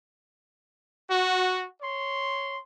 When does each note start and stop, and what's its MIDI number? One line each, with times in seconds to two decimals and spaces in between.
1.09 1.66 66
1.81 2.58 73
1.81 2.58 84